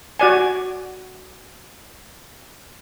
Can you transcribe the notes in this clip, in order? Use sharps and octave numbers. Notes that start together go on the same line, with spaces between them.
F#4 D5 G#5